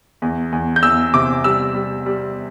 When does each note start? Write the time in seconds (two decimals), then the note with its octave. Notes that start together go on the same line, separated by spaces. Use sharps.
0.22 E2
0.52 E2
0.76 G6
0.83 E2 E6
1.14 C3 D6
1.44 G3 E6
1.75 G3
2.06 G3